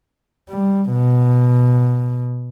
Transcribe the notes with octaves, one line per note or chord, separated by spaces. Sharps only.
G3
B2